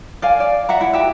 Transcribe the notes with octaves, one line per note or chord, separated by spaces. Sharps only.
D5 F5 G#5
D5
E5 F#5 A#5
E4
F#4 G4 E5